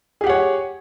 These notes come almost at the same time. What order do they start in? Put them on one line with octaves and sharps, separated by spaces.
G#4 G4 F#5 C#5